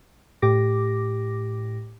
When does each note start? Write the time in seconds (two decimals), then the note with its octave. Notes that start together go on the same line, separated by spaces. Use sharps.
0.42 A2 G4 D6 A#6